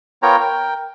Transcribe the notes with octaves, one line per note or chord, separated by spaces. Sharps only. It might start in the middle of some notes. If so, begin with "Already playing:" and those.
B3 F4 A#4 C#5 G5 A#5
A#4 G5